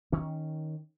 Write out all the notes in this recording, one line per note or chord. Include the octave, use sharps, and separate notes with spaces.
D#3 C#4